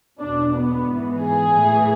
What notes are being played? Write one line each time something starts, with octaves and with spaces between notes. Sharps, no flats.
E2 B2 D4
B3
G#2 E3
G#4
A2 E3